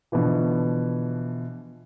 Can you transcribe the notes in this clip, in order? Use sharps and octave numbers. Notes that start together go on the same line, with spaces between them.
B2 D3 E3 F3